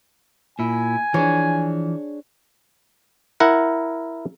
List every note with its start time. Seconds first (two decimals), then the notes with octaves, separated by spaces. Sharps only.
0.59 A#2 E4 G#5
1.14 E3 F3 D4 G#4 C#5
3.40 E4 A#4 F#5